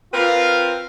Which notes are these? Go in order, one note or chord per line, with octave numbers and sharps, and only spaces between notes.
C4 F4 A#4 B4 F5